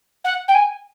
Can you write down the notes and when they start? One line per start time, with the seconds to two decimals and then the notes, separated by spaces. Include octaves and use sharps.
0.24 F#5
0.48 G5
0.54 G#5